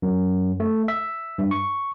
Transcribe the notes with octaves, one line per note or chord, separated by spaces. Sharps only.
F#2
A3
E5
G2
C#6